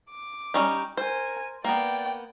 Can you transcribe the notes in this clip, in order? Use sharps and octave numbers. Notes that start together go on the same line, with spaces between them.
D6
G3 C#4 D#4
A#4 C5 G#5
A#3 B3 D5 G5